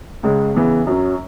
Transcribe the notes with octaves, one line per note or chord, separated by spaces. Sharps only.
C#2 C#3 G#3
E2 C#3 E3 B3
F#2 F#3 C#4